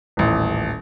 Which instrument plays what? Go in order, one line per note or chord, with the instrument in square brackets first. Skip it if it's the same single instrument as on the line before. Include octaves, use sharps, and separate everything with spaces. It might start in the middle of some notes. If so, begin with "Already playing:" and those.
[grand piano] D#1 A1